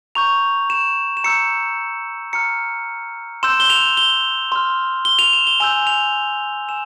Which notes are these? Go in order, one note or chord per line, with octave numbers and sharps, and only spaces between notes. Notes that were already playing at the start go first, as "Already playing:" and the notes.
A#5 C#6 G6 F7
E7
E7
A#5 E6 G6 C#7
A#5 F6 C#7
C6 E6 G6 E7
G7
F7
G7
C6 F6
G7
F7
E7
G7
G#5 E6 G6 F7
F7
G#5 E6 E7